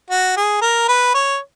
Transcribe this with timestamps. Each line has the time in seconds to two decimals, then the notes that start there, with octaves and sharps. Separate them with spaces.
0.11 F#4
0.37 G#4
0.61 A#4
0.88 B4
1.14 C#5